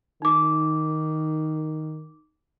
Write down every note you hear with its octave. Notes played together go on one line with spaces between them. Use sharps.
D#3 D#4 D6